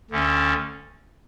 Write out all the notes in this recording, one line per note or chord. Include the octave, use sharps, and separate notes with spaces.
D2 D3 A3 C#4